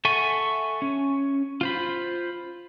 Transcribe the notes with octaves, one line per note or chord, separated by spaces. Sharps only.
A4 E5 F#5 G#5 C#6
C#4
F4 C5 B5